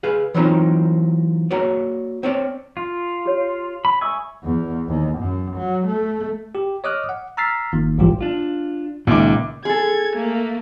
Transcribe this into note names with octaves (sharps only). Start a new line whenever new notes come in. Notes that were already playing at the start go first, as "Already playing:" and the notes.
G#4 B4 F5
E3 F#3 A#3 C4 D#4 F4
A#3 F#4 C#5 D5
C4 C#5 D5
F4
G4 C#5
B5
E5 G#5 C#6 D#6 E6
E2
D#2
F#2
F#3
A3
G4
C#5 D#5 D6 D#6 F6 F#6
F#5
A#5 E6 F6 A6 B6 C7
G1 D#3 A#3
A#1 G#2 E3 G3 F4 G4
D4 F4
C#2 A#2 D#3 D5 E5 D6
G#4 A4 G#6
A3 A#3